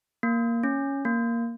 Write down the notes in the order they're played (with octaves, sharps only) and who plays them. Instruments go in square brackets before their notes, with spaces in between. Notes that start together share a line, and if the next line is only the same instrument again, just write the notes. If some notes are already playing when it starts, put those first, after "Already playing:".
[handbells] A#3
C#4
A#3